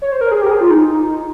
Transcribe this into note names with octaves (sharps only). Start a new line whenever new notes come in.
C#5
C5
A#4
G#4
G4
A#4
G#4
F4
D#4